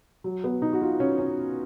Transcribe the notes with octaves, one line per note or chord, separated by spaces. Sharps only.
F#3
B3
D#4
F#4
F4
C#4
C#4